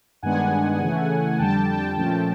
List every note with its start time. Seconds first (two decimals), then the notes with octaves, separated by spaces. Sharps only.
0.23 G2 D#3 G#3 B3 D4 F#5 G#5
0.81 C#3 E3 A3
1.39 F2 D3 G3 G5 A5
1.68 G5 A5
1.97 A#2 F3 A3 C#4 G5 A5